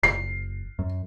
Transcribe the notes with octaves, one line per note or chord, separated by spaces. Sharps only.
F#1 C7
F#2